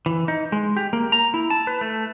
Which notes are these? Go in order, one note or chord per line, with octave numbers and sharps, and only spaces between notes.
E3
D#4
G#3
G4
A#3
A#5
E4
A5
B4
A3